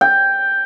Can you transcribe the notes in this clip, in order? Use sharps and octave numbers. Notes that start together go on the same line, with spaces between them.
G5